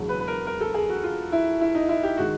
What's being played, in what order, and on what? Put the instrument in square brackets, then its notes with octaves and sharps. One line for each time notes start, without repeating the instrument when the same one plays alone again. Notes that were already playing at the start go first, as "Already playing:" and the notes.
Already playing: [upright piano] E1 E2 C#3 F#3
B4
B4
A#4
A#4
A4
G#4
F#4
F4
E4
E4
D#4
E4
G4
D#3 G#3 F#4